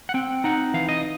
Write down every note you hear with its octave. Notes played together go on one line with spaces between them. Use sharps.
F#5
C4 G5
D#4 F#5
E3 F5
D#5